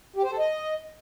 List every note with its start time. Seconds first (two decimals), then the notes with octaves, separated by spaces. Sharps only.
0.16 G4
0.24 C5
0.31 A4
0.39 D#5